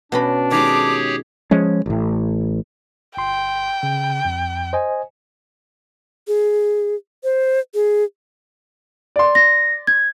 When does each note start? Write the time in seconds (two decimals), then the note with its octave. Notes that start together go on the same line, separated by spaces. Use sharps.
0.12 B2 C#4 D4 B5
0.51 D#3 G#3 G4 G#4 C#5 D6
1.51 F3 G#3 C#4
1.86 A1 A2
3.17 G1 G5 C6
3.83 C#3
4.25 F2
4.73 C5 D#5 G#5
6.28 G#4
7.24 C5
7.75 G#4
9.16 D5 C6
9.35 A#6
9.87 G#6